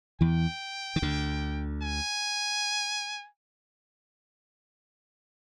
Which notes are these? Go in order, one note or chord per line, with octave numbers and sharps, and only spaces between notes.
E2 E3 G5
D#3
D2 D3
G#5